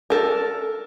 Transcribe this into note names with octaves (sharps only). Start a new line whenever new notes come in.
A4 A#4